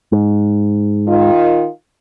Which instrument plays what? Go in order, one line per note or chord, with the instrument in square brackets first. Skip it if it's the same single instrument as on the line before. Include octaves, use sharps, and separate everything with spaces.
[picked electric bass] G#2
[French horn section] D#3 F4